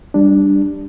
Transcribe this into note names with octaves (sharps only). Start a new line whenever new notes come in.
G3 D4